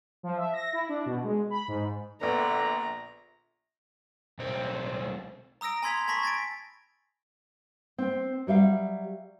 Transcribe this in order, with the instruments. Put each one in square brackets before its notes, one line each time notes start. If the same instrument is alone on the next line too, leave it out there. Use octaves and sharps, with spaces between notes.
[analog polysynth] F3
E5
A#6
E4
D4
B2
G#3
B5
G#2
[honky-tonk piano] A#1 B3 [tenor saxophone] D3 [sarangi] A#5
[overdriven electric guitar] B1 C4
[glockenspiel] A#5 D#6 E6 A#6 D7
G#5 B5 C6 G#6 B6 F7
G#5 A5 B5 C#6 A#6 B6
G#6 A6 B6 D7
[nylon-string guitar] C4
F#3 G3 E5 F5